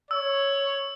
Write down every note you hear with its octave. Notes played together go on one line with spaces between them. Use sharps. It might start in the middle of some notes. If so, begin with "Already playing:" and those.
C#5 E6